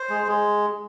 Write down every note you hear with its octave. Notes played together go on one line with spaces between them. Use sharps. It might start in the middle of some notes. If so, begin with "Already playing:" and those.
Already playing: C5
G#3
G#3